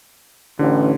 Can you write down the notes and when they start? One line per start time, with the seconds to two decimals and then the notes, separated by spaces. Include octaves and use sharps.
0.59 A1 D3